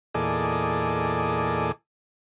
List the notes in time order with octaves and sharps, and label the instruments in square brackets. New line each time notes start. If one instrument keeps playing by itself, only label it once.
[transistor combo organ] E2 A#2 G#4 A4 D5 D#5